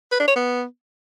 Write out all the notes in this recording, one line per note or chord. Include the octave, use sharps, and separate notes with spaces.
B4
D4
C#5
B3